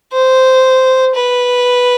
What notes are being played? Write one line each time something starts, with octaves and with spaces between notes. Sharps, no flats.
C5
B4